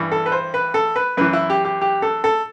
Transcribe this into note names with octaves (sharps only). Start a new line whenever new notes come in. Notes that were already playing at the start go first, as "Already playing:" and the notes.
Already playing: G2 E3
A4
B4
C5
B4
A4
B4
F#2 E3 B4
E4
G4
G4
G4
A4
A4